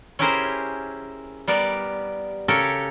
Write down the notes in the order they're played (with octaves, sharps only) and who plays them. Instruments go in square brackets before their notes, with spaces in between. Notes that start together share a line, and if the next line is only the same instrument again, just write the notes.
[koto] C#4 E4 G4 G#4 A#4 C5
G3 B3 A#4 D5
C#3 G4 A4 A#4 C#5